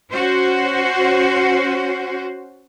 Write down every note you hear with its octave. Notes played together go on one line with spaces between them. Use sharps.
C#4 F#4 C5